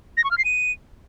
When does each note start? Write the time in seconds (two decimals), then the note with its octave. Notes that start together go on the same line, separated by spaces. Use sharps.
0.17 A#6
0.24 C#6
0.31 F6
0.38 C7
0.45 D#7